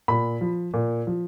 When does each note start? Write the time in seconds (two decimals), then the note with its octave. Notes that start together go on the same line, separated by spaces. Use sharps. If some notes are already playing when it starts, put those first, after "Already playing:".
0.08 A#2 B5
0.41 F3
0.74 A#2
1.07 F3